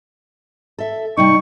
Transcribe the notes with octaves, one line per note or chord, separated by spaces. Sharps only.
A4 E5
C3 G3 D#4 C#6